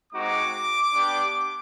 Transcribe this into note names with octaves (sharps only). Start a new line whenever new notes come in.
G#3 C4 D#4 F#4 D6
B3 D4 G4